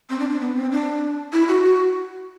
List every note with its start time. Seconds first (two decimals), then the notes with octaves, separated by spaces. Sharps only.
0.10 C4
0.19 D4
0.30 D4
0.40 B3
0.55 C4
0.72 D4
1.33 E4
1.48 F#4
1.63 F#4